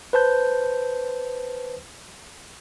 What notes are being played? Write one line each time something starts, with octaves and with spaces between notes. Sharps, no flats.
B4 C5 A5 G6